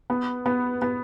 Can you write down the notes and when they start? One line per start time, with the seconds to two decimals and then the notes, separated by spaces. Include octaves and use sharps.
0.10 B3
0.46 B3
0.82 B3